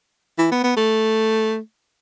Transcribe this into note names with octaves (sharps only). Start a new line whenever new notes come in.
E3
B3
B3
A3